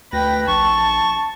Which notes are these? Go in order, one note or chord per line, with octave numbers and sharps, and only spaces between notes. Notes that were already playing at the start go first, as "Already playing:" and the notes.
D2 B4 G5 A#6
A#1 A5 C#6